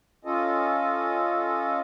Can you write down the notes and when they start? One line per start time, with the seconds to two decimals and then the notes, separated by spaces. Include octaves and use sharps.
0.25 C#4 F4 A4 D#5